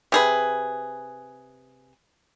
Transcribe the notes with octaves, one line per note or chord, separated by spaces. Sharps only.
C3 G#4 B4